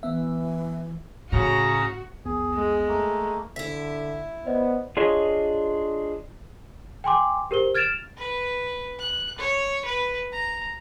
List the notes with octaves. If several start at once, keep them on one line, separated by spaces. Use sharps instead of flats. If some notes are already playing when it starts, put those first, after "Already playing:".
E3 B3 E5
A2 C#3 F#4 A#5
C2 F2 B3 G#4
G#3
A3 A#3
D3 E4 E5 B6
B3 C5 D5 D#5
D4 F4 G#4 C#5 D#5
G5 G#5 C6 D6
G4 A#4 C5 G7
F6 G#6 A6 D7 E7 F7
B4
F#6
C#5
B4
A#5